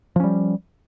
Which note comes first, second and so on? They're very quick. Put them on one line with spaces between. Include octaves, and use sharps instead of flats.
F3 C#4 G3